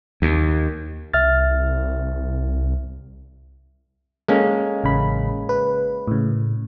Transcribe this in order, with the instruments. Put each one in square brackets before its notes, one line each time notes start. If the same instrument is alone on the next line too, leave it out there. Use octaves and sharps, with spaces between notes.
[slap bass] D#2
[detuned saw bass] C2 [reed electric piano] E5 F6 A6
[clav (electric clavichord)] G#3 A#3 C#4 [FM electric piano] A4
[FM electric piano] A1 C#3 B5
B4
A2 C#3